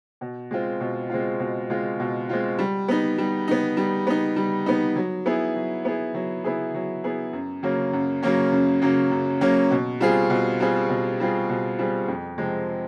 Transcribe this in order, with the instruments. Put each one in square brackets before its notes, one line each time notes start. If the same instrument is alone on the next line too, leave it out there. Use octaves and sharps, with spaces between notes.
[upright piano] B2
G#3 C4 F4
B2
G#3 C4 F4
B2
G#3 C4 F4
B2
G#3 C4 F4
G3
B3 D#4
G3
B3 D#4
G3
B3 D#4
G3
B3 D#4
F#3
B3 E4 G#4
F#3
B3 E4 G#4
F#3
B3 E4 G#4
F#3
B3 E4 G#4
F#2
C#3 F#3 A#3 C#4
F#2
C#3 F#3 A#3 C#4
F#2
C#3 F#3 A#3 C#4
F#2
C#3 F#3 A#3 C#4
B2
G3 C4 F4 G#4
B2
G3 C4 F4 G#4
B2
G3 C4 F4 G#4
B2
G3 C4 F4 G#4
F2
C3 F3 G#3 C4